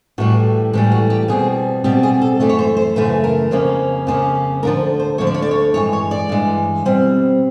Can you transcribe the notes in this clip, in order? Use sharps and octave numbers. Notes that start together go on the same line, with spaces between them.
A2 E3 G3 F#4
A2 E3 G3 G4
F#4
G4
B2 G3 C4 G#4
B2 G3 C4 G4
G#4
A4
F#2 C#3 E3 A3 D5
C#5
C5
C5
F#2 C#3 E3 A3 B4
A#4
F2 C#3 F3 A#3 C#4
F2 C#3 F3 A#3 C#4
D2 D3 F3 A#4
C5
D2 D3 F3 C#5
D5
C#5
D5
C#5
G2 E3 G#3 C#5
C#5
D5
G2 E3 G#3
B2 G3 C4